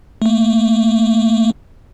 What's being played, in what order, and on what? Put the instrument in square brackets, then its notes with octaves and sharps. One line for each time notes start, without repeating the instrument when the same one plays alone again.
[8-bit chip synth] A3 A#3